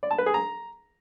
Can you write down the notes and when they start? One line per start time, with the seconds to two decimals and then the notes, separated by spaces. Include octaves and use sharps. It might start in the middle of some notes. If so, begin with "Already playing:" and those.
0.03 D5
0.11 A5
0.18 B4
0.26 G#4
0.34 A#5